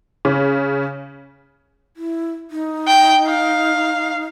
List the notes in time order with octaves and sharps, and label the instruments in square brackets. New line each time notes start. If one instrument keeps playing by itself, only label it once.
[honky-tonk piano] C#3
[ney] E4
D#4
[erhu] G5
F5